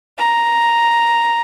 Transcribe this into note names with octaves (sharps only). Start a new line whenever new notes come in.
A#5